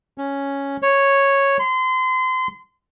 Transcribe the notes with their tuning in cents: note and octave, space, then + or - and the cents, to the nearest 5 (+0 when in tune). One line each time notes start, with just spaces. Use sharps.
C#4 +0
C#5 -5
C6 -30